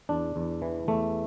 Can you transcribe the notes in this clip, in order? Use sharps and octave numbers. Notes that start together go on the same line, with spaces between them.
E2 D4
E2
E3
E2 A3